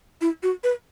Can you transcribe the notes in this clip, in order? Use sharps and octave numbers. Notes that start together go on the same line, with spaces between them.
E4
F#4
B4